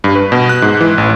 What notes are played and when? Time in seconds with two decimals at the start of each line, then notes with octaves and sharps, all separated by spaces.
0.04 G2
0.15 B4
0.32 B2
0.49 F#6
0.62 G#2
0.81 E3
0.98 A1